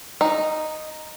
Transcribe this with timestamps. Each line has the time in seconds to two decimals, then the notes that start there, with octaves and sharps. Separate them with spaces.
0.21 D#4